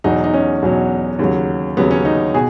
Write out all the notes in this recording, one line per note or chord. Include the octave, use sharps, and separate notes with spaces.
E2 B2 F#3 D#4
D#4
C#4
E2 B2 F#3
D#2 C#3 F#3
D#2 C#3 F#3 B3
C#4
D#4
B2 G#4